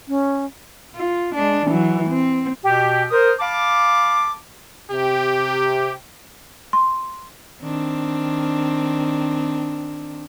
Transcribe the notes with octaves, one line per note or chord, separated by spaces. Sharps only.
C#4
F4
G#3 D4
E3 F#3
C4
B2 G4
A#4 C5 D#6
F5 A5 B5 D6
C3 G4
C6
D#3 C4 D4